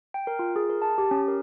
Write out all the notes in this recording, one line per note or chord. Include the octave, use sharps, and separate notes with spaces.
G5
A#4
F4
G#4
A#4
A5
G4
C#4
A#4